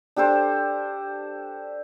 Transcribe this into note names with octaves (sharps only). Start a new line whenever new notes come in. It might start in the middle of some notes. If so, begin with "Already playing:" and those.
D4 G4 A4 C5